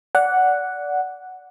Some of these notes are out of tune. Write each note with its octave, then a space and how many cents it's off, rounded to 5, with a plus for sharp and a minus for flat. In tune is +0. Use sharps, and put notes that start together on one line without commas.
D5 -20 F#5 +0